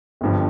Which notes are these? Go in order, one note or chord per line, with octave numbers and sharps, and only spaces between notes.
G1 G2 F3